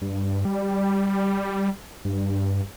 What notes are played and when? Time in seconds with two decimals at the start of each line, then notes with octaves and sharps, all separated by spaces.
0.02 G2
0.45 G3
2.05 G2